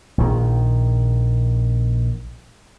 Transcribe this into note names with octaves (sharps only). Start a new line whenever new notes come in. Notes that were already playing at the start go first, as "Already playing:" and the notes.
A#1 D#3